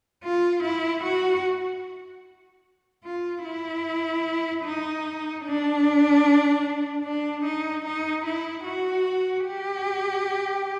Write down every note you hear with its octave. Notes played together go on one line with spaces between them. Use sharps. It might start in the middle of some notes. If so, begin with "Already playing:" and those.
F4
E4
F#4
F4
E4
D#4
D4
D4
D#4
D#4
E4
F#4
G4